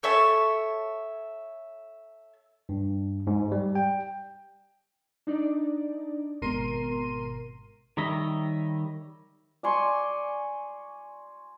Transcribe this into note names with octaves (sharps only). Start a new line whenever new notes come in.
A4 C#5 E5 A5
G2
G#2
G3
G5
D4 D#4 D5
G#1 B2 A#4 C6 D#7
D#3 G3 C#5 D#5 E5
D5 G#5 C6 C#6